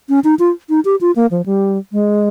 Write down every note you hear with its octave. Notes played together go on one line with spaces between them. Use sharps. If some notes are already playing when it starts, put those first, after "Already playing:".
C#4
D#4
F4
D#4
G4
F4
A#3
F3
G3
G#3